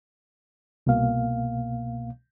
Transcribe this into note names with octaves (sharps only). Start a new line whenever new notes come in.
C2 B2 A#3 F5